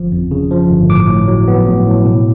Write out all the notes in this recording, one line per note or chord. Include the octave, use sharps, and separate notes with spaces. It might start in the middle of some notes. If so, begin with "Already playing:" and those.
Already playing: G1 F3
F2
C#3
F3
G1
A2 D6
A2
F#3
B3
A2
A2
B2